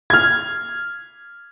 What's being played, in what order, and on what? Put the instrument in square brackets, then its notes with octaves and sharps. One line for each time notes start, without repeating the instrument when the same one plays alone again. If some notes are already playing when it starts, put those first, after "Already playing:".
[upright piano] F6 G#6